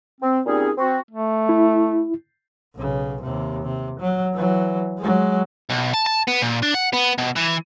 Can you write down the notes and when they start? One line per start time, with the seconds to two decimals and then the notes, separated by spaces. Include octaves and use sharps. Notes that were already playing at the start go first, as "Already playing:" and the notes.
0.21 C4
0.46 A#2 G3 C4 C#4 D#4 G#4
0.78 C4 F#4
1.11 A3
1.49 E4
2.76 B1 C#3
3.22 D#2 C3
3.64 C3
4.00 F#3
4.34 E3 F#3
4.99 F#3 G#3
5.69 B1
5.94 A5
6.06 A5
6.28 B3
6.42 A#2
6.63 D4
6.75 F#5
6.93 B3
7.18 B2
7.36 E3